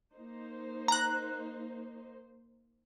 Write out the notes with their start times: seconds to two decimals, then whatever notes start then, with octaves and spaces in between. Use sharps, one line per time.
0.15 A#3 D#4 C5
0.88 A#5 F#6